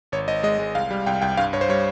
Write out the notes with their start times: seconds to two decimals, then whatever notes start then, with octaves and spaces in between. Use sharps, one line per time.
0.12 G#1 C#5
0.28 G#1 D#5
0.43 G#3 D#5
0.59 G#3
0.75 C2 F5
0.91 G3
1.06 C2 G5
1.22 C2 G5
1.37 G2 F5
1.53 G2 C#5
1.61 C5
1.69 G3 C#5